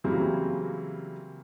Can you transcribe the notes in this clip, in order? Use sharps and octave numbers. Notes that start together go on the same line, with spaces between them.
C#3 E3 F#3 G3 A#3 C4